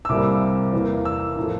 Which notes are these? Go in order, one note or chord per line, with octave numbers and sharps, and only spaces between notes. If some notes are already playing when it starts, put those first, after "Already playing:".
E6
C2 C3 G3 A#3 D6
E2 E3 A#3
E6
A2 F3 A3